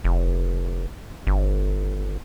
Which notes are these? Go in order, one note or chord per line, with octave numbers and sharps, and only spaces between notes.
F1
G1